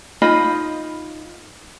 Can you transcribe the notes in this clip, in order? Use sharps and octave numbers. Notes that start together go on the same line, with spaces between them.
D#4 F4 D#5 B5